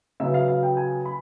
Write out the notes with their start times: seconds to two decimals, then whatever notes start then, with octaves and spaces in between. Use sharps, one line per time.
0.20 C#3 F#3 B3 E5
0.34 F5
0.48 F5
0.63 G5
0.77 G#5
1.05 B5